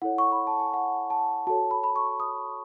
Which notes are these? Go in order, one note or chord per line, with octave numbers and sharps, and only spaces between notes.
E4 A4 C#5 F#5
C#6
B5
A5
G#5
F#5
A5
F#4 A4 C#5 A5
B5
B5
C#6
D#6